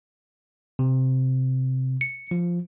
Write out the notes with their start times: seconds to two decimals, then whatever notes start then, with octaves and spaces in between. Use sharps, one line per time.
0.79 C3
2.01 C#7
2.31 F3